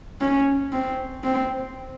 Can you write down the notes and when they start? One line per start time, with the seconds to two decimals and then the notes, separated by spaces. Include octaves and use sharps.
0.21 C#4
0.72 C4
1.24 C4